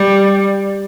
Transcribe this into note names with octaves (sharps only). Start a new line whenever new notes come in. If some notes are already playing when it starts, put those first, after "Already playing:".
Already playing: G3